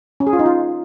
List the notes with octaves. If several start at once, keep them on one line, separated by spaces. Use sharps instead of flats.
C#4
G#4
F4
D#4
F4